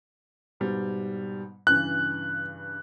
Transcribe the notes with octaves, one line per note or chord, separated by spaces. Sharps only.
G#2 B2 G3
G2 C#3 E3 F#6